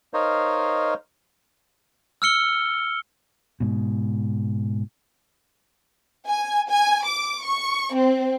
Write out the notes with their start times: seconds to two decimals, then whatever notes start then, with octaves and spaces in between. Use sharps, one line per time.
0.14 D#4 A#4 C5 C#5 D#5 F5
2.22 E6 F6 C#7 G7
3.60 G#2 B2
6.28 G#5
6.69 G#5
7.06 D6
7.43 C#6
7.94 C4